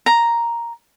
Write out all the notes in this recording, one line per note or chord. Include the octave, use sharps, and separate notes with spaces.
A#5